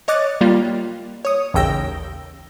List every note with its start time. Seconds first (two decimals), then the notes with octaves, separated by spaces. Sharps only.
0.08 C#5 D#5 D6 F#6 A6
0.41 G3 A#3 F4
1.25 C#5 D#6
1.54 A1 D#2 C#3 G5 E6 A#6